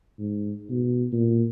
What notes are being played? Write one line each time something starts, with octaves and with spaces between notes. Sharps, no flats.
G#2
B2
A#2